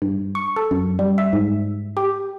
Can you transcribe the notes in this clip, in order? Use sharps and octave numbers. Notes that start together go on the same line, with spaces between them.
G2
C#6
A4
F#2
G3
E5
G#2
G4